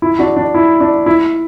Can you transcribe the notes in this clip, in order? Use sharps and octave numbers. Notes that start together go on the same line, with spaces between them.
E4
D4 F#4
D4
E4
D4
E4